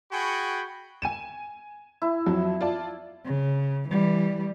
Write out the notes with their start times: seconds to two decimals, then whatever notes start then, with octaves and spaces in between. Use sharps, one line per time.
0.11 F#4 G#4 G5 G#5 B5 C#6
1.02 G#5 D#7 E7
2.02 E4
2.26 F2 F#3
2.61 F4 D5 A5
3.25 C#3
3.89 E3 G3